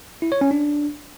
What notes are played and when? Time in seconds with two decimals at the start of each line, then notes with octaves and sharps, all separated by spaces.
0.22 E4
0.32 C#5
0.41 C#4
0.51 D4